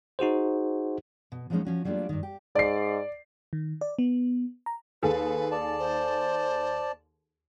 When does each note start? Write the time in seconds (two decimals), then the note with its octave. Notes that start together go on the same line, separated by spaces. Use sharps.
0.19 D#4 F#4 G#4 C5
1.32 B2
1.50 F3 F#3 G#3 A#3 C#4 D#4
1.65 F3 C#4 F#4
1.85 F#3 G3 A3 A#3 D4 F4
2.09 G2 D#3
2.23 G4
2.56 G#2 D5 C7
3.53 D#3
3.81 D5
3.99 B3
4.66 A#5
5.03 D#2 G#4 A4 B4
5.51 D5 A5
5.79 C5